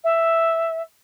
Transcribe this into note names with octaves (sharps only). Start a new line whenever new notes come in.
E5